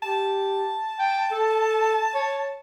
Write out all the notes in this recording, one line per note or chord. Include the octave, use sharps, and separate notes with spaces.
G4 A5
G5
A4
C#5